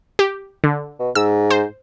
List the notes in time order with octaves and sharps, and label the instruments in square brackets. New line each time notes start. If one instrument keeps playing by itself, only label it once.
[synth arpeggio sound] G4
D3
[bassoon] B2
[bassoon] G#2 [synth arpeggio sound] E6
[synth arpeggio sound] C5